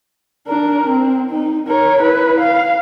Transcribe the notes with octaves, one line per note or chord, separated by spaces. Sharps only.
D4 A#4
C4
D#4
A#4 C#5
E4 B4
F5